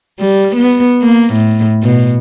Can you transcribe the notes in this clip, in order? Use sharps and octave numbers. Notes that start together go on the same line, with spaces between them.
G3
B3
A#3
A2
B2